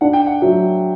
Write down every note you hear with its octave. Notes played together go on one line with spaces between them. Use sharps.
D4 F#5
G5
F#5
F#3 E5